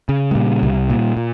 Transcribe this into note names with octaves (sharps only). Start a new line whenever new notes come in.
C#3
G#3
A#2 G3
C2
A#2
A#2